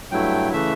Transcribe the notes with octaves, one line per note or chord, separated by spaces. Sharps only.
G2 F#3 A3 E4 G5
C#3 E3 A3 E5